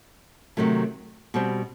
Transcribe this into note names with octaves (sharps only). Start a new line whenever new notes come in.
C3 D#3 F#3 A3
B2 G3 C4